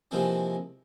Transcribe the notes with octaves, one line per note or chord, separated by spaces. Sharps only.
C3 E3 F3 G#3 A#3 C4